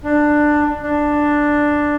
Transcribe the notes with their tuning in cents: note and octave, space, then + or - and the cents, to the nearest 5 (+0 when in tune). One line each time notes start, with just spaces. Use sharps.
D4 +15
D4 +5